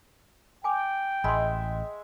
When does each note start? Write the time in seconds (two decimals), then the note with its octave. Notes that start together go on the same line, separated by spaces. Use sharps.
0.64 G5 G#5 D6
1.24 A1 G#3 E5 G#5 B5 C6